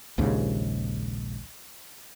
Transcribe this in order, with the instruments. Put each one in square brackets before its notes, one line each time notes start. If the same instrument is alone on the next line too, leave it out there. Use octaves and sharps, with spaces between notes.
[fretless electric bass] A#1 D#2 G#2 C#3